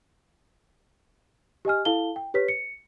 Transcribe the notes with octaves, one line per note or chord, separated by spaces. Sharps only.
G4 D#5 G#5 F6
E4 A4 F5 A5 G7
G5
G4 B4 C#5 B6
C#7